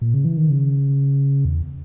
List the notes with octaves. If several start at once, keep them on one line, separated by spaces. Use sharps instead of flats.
A#2
C#3
E3
D#3
C#3
E2